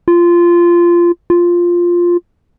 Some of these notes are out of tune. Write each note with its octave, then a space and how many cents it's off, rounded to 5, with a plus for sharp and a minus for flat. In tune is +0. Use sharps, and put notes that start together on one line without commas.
F4 -15
F4 +0